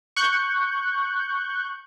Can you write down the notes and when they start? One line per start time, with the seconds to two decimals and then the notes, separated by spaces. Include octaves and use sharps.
0.16 C#6 F#6 G6